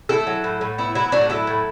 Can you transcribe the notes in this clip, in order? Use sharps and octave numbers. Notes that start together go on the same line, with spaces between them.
A3 E4 A4
F#3
A2
A2
B3 E4
F#3 E4
A2 D4 F#4
F#3 E4 A4
A2